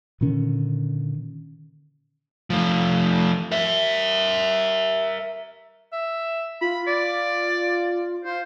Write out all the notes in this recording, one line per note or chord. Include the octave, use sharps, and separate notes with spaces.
A#2 D3 D#3 C#4
F3 A3
A#4 E5
E5
F4 B5
D5
F4 C5